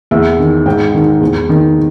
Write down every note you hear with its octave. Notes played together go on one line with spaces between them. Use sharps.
E2 E5
D#3
G#2 G5
D#3
E2
D#3